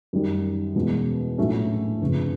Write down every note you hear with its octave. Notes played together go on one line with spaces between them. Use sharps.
F#2 D#3 G3
E2 B2 G#3 C#4
A#1 A2 F#3 A3 C#4
G1 F2 C#3